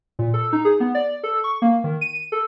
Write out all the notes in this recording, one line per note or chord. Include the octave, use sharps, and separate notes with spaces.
A#2
A4
D#4
G#4
B3
D5
A4
C#6
A#3
D#3
D#7
A4